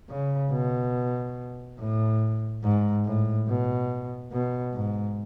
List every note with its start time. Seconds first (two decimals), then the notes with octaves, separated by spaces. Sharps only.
0.10 C#3
0.52 B2
1.79 A2
2.63 G#2
3.05 A2
3.48 B2
4.32 B2
4.74 G#2